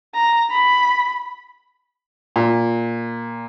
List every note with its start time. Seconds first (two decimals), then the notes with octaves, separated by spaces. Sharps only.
0.14 A#5
0.50 B5
2.36 A#2